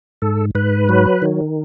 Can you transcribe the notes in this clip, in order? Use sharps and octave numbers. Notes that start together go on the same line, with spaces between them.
G#2 A4
G#2 B4
F#3
D#3